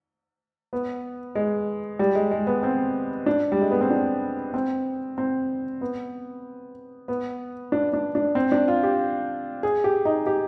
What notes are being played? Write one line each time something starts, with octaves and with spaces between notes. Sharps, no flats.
B3
G#3
G3
G#3
G#3
B3
C4
D4
G3
G#3
B3
C4
D4
C4
C4
B3
B3
D4
D4
D4
C4
D4
F4
G4
G#4
G4
D#4
G4